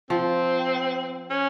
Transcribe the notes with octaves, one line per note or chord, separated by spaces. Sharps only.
F3 C4
C#4